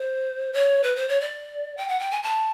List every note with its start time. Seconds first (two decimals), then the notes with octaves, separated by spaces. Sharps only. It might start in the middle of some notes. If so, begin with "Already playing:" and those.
Already playing: C5
0.53 C#5
0.84 B4
0.96 C5
1.09 C#5
1.21 D5
1.77 G5
1.88 F#5
2.00 G5
2.11 G#5
2.23 A5